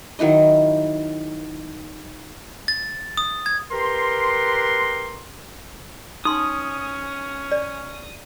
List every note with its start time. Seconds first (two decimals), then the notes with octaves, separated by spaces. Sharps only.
0.19 D#3 F#3 E4 D#5
2.68 A6
3.17 D#6
3.46 G#6
3.71 G4 A#4 B4 A#5 C6
6.25 C#4 D#4 C6 D#6
7.52 D5